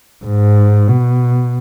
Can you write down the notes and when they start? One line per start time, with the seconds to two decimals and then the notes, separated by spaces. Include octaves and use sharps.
0.24 G#2
0.88 B2